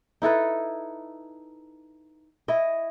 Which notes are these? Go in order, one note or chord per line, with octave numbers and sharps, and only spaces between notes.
D#4 E4 A4 B4
E4 D#5